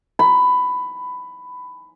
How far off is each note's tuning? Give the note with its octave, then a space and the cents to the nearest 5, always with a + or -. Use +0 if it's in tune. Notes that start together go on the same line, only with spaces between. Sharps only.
B5 +15